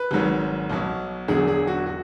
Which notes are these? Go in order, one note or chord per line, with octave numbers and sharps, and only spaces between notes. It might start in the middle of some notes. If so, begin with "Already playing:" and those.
Already playing: B4
G#1 G#2 F#3
B1 B2 F#3
E1 E2 D3 F#3 G#4
G#4
F#4
F#4